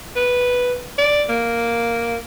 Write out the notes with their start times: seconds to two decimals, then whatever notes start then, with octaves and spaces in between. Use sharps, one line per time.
0.16 B4
0.98 D5
1.29 A#3